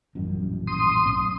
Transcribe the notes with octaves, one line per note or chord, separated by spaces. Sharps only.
D#1 A1 F#2
C6 D#6
B1 C#4